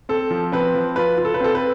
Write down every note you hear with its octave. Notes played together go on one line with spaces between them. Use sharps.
C4 A4
F3
C4 B4
F3
F4 B4
F4
A4
B4
C4 A4
B4